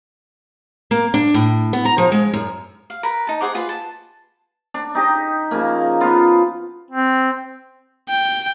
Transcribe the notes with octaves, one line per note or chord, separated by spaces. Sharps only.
A#3
D4
A2
B3
A#5
F3
G#3
F#2
F5
A#4 B4 B5
D#4 A5
G#4 C5 F#5 D6
F4 G#4 B4 C6
A5
D4
D#4 G4 D#5
C#3 F3 A#3
F3 B3 F4
C4
G5